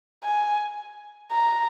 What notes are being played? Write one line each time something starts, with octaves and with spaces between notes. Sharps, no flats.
G#5
A#5